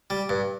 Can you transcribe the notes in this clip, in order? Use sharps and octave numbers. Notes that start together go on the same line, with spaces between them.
G3
G2